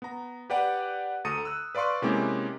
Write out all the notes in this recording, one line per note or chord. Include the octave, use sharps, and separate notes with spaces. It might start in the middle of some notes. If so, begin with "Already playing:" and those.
B3 A#5
G4 B4 D5 F#5 G5
D2 A4 A#5 D#6 C#7 D#7
E6 F#6
B4 D5 F5 C6 C#6
C3 G#3 A#3 C#4 E4 G4